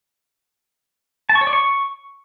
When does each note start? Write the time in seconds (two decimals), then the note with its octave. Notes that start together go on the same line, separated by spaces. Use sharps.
1.29 A5
1.35 C#6
1.41 C#5
1.47 D5
1.53 C#6